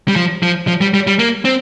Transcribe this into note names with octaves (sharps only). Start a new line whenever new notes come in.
G3
F3
F3
F3
G3
G3
G3
A#3
C4